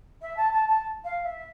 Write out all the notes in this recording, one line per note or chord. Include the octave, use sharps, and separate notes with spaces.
E5
A5
A5
A5
F5
E5